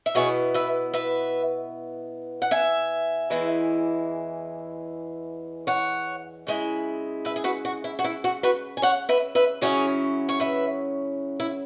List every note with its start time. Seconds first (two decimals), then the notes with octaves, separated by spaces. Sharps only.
0.06 E5
0.15 B2 B3 E4 G#4 C#5
0.54 B4 E5
0.94 B4 E5
2.42 F#5
2.51 E5 G#5
3.30 E2 E3 G#3 E4
5.67 C#5 F#5
6.47 C#3 G#3 E4
7.25 B4 E5
7.36 G#4
7.44 F#4 B4
7.65 F#4
7.84 E4
7.99 F#4
8.04 E4
8.24 F#4
8.43 F#4 B4
8.77 G#5
8.82 C#5 F#5
9.09 B4 E5
9.35 B4 E5
9.61 C#3 F#3 C#4 E4 G#4 C#5
10.29 C#5
10.40 B4 E5
11.40 E4